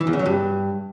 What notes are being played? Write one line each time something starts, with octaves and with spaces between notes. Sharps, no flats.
E3
E2
C#3
F#3
G2